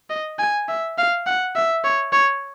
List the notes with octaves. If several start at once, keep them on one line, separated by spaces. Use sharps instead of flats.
D#5
G#5
E5
F5
F#5
E5
C#5
C#5